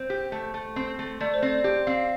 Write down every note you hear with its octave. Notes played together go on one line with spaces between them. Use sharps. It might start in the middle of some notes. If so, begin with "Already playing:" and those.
Already playing: C4 C5
G4
A3
A3
C4
A3
A3 D5
C5
C4 D5
G4
C4 F5